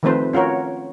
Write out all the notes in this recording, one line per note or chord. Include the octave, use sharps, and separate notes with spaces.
D#3 F3 A3 C4 B4 C5
C#4 F4 F#4 A#4 C#5